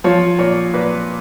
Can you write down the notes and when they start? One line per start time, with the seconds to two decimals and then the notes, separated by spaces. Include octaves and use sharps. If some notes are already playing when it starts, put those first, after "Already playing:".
0.04 F3 C#5
0.39 A#2 C#5
0.74 A#2 B4